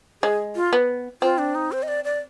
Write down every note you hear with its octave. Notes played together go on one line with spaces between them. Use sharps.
G#3 G#4
F4
B3
C4 F4
D4
D#4
C5
D#5
D5
D5